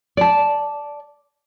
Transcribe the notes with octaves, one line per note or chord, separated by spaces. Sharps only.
D5 A5